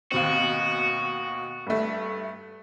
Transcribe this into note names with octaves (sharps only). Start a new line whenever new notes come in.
D#2 B2 C4 F#4
G2 A3